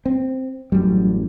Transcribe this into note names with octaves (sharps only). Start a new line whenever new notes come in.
C4
A1 F#2 G3